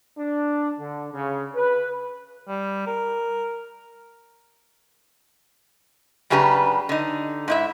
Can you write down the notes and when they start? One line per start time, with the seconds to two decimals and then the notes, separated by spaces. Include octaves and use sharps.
0.19 D4
0.79 D3
1.14 C#3
1.55 B4
2.48 G3
2.87 A#4
6.30 F#2 C#3 D4 G4 B4 A#5
6.89 D3 D#4
7.48 G#2 E4 E5